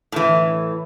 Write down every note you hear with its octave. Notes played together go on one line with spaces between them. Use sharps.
A2 E3